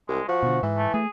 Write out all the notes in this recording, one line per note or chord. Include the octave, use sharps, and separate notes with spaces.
C2 G#3
F3 F#4
B2 D3
G#2 E3
A3
A3 G#4